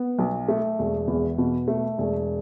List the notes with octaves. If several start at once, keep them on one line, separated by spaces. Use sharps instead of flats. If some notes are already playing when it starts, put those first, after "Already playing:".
Already playing: B3
B1
A3
E1
E2
B2
A3
E1